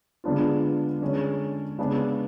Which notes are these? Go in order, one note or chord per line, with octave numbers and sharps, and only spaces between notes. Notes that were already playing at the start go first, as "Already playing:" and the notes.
D3 G#3 B3 D4 F4
D3 G#3 C#4
C#3 G#3 B3 D4